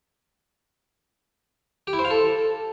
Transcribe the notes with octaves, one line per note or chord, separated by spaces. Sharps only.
G4
E4
C5
F5
A4